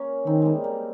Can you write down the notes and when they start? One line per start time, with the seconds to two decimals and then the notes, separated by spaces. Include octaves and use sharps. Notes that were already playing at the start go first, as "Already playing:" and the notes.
Already playing: A#3 C#4
0.27 D#3 C4 D#4
0.42 G3 G#3 A#3
0.64 G3 A#3